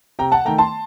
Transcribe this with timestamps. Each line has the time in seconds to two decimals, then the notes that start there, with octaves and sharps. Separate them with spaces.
0.19 C3 G5 A#5
0.32 F#5 A5
0.45 D#3 A3 G5 A#5
0.58 A5 C6